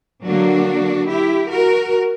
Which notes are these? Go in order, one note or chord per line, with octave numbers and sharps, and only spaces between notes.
D3 F#3 A#3 D4 F#4
E4 G4
F#4 A#4